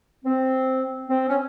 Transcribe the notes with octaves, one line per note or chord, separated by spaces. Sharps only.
C4
C4
C#4